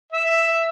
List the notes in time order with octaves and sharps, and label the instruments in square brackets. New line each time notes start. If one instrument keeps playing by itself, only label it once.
[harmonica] E5